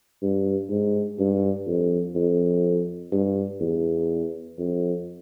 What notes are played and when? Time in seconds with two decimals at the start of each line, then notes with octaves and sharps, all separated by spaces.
0.22 G2
0.70 G#2
1.19 G2
1.67 F2
2.15 F2
3.12 G2
3.61 E2
4.58 F2